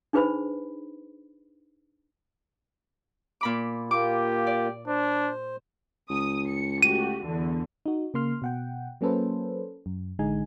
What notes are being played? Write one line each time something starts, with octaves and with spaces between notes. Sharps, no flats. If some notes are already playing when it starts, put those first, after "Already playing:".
D4 D#4 G#4 B4 C5 B5
A#2 B5 D6
A#3 F4 G4 D6
D5
D4 C5
C#2 D#6
C#7
A3 F#4 G4 D#7
E2 D3 E3
D#4 F#4
C#3 A#3 C6 F6
B2 F#5 G5
F#3 A#3 C#4 A4 B4 C5
F#2
A1 D3 G#3 D#4 G#5